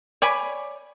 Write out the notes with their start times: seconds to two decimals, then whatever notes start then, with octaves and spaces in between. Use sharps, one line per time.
0.22 C#5 D5 G#5 B5